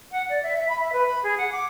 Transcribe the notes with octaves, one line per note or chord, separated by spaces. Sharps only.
F#5
D5
E5
E5
B5
E5
B4
B5
G#4
F#5
D6